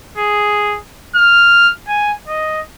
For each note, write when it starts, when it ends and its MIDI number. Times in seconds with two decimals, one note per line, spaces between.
0.17 0.78 68
1.15 1.70 89
1.88 2.12 80
2.28 2.60 75